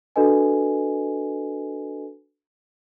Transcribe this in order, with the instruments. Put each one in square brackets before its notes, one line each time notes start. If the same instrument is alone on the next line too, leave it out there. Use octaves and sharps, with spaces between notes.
[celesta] D4 F#4 A4 B4 D#5 G#5